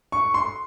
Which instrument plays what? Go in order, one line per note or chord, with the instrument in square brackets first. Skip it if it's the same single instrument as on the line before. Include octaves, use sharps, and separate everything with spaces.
[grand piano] C#6
C6